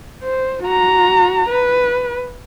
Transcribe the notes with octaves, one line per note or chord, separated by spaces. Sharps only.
C5
F#4 A#5
B4